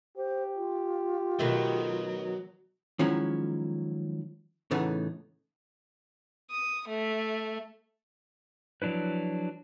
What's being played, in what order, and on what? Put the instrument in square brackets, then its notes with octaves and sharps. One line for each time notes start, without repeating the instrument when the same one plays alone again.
[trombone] G4 [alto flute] C5
[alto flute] F4
[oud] B2 D#3 A3 [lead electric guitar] F#3
[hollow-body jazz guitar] D#3 F3 F#3 G#3 C#4 E4
A2 C#3 E3 A3 B3 D#4
[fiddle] D#6
A3
[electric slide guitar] F3 F#3 D4 E4 B4